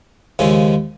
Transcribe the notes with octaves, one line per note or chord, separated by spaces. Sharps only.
D#2 C#3 F3 G#3 C#4